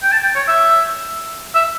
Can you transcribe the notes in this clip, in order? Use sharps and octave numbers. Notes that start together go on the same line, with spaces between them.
G5
A5
G5
C#5
E5
E5